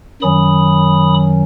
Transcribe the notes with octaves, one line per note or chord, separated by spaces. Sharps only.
F#2 D#3 F#3 C#4 B5 D#6